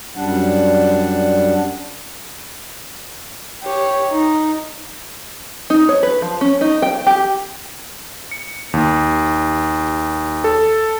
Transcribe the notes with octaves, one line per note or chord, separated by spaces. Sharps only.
F#2 G3 D4 F#5
G4 C#5
D#4
D#4
C#5
B4
F3
C#4
D#4
G5
G4
C#7
D#2
A4